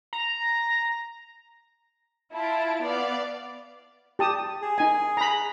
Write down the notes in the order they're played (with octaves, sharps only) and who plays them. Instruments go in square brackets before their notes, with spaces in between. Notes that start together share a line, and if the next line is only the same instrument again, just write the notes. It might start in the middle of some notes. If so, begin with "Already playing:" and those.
[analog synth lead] A#5
[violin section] E4 F4 A5 D7
B3 D5 F5
[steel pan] G4 A5 D#6
[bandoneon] G#4
[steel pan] D#4 G#5
A#5 B5